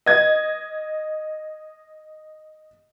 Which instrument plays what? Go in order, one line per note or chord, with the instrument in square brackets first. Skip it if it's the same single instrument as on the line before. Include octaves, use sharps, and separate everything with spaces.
[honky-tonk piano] D#5 G#6